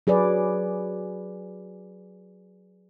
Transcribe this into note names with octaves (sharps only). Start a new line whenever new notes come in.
F#3 G#4 B4 D5